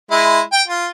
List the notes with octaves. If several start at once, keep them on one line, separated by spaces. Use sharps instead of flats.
G#3 E4
G5
F4